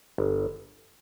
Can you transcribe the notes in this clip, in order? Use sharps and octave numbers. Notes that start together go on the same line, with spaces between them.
G1